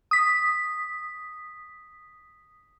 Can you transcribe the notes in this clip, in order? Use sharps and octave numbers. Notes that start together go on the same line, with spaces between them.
D#6 B6